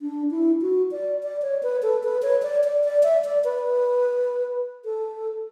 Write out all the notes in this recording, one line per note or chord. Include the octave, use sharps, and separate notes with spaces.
D4
E4
F#4
D5
D5
C#5
B4
A4
B4
C#5
D5
D5
D5
E5
D5
B4
A4